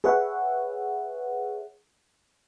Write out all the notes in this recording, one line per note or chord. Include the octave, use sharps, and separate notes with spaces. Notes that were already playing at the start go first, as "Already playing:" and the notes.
G#4 B4 C#5 E5 F#5